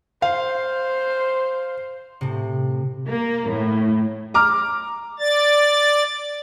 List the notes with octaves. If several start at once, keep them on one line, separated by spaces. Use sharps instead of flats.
C5 F5
A2 C3
A#3
A2
A#5 D6 F6
D5 A6